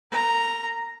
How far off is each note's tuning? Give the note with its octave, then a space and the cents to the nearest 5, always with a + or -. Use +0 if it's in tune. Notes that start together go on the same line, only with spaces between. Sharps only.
A#4 -40 A#5 +0